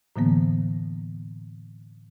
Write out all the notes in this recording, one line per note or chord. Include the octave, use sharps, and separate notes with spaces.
A2 D3 E3 F#3 A#3 B3